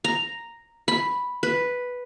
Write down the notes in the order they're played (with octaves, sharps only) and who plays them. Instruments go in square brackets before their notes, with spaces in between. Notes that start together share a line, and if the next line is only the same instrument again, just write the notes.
[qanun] A#5
B5
B4